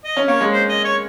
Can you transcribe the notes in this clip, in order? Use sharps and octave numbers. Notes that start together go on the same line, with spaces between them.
D#5
C#4
A#3 C#5
G#3
C5
D#5
C#5